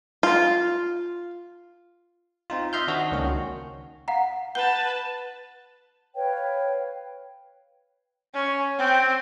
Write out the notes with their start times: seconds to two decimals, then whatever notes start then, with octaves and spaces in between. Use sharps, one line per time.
0.23 F4
2.50 C4 D#4 F4
2.73 D#5 E5 C6 F6 G6
2.88 D#3 D4 F#4 C5 D#5
3.12 C#2 D#3 A#3 C#4 F#4
4.08 F5 F#5 A#5
4.55 B4 F#5 A5 G6 G7
6.14 B4 C#5 F5 G5
8.34 C#4
8.78 C4